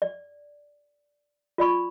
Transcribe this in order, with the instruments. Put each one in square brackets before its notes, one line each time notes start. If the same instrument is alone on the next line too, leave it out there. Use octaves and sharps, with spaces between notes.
[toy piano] D5
F4 D5 B5 C#6